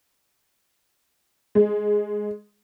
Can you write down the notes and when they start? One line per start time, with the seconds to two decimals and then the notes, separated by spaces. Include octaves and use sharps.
1.55 G#3